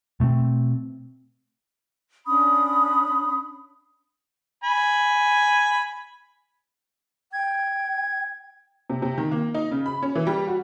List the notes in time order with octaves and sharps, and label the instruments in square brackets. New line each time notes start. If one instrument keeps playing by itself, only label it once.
[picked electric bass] B2 A3 B3 C4
[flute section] C#4 D4 B5 D#6
[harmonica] G#5 B5
[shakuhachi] G5 [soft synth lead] G#6
[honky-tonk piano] C3
C3
D#3
A#3
D#4
C#3
B5
C#4
E3
G3
F#4